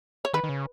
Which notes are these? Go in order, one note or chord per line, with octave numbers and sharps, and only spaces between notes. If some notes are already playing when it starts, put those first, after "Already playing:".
C#5
D#3 B4
D#3
C#3